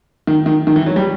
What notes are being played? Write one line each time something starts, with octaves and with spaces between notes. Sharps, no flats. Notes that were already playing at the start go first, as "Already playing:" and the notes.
D#3
D#3
D#3
E3
F#3
G3